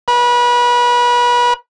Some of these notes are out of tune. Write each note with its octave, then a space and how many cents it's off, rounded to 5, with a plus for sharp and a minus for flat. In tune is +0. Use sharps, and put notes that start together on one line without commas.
B4 -30